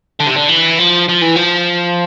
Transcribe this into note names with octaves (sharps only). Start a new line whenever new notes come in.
D3
C3
D3
E3
F3
F3
E3
F3